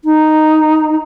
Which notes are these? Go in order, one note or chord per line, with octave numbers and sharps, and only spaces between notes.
D#4